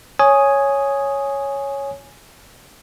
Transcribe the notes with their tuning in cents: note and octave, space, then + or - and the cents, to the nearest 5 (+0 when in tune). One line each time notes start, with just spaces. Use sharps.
C#5 +0 G#5 +0 D#6 +0